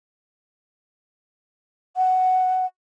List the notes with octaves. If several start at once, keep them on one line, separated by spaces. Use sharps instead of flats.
F#5